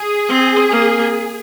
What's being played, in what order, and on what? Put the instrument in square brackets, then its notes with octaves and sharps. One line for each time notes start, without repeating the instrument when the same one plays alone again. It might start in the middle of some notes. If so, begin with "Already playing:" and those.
Already playing: [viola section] G#4
[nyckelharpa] C4
A#3